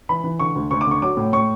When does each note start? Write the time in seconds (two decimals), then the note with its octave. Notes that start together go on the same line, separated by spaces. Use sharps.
0.09 E3 B5
0.24 E3
0.39 D3 C#6
0.56 D2
0.71 D2 C#6
0.81 D6
0.87 D3 C#6
1.02 F#3 D6
1.17 A2
1.33 A2 C#6